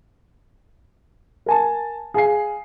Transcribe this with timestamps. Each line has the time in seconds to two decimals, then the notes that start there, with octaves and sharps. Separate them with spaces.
1.46 A#4 G#5 A5
2.14 G#4 F5 G#5 C7